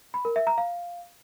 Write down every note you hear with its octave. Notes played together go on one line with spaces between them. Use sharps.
B5
A#4
E5
A#5
F5